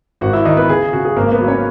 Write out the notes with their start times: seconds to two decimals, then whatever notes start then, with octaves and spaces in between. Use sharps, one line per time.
0.21 G#1 F#4 F#5
0.33 E4 E5
0.45 D#3 D#4 D#5
0.57 B3 B4
0.69 C#3 G#4
0.93 C#3 F#4
1.05 G#4
1.16 G#1 A#3 A#4
1.32 B3 B4
1.41 F#3
1.48 C#4 C#5